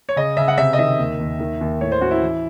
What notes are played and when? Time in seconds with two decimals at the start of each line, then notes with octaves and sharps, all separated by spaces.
0.09 C#5
0.16 C#3 D#5
0.37 C#3 E5
0.48 F#5
0.58 C3 E5
0.73 D#5
0.79 D#3 E5
0.99 D#2
1.20 D#2
1.40 D#3
1.61 D#2
1.80 A2 C#5
1.92 C5
2.01 C#4 F#4
2.11 E4
2.22 E3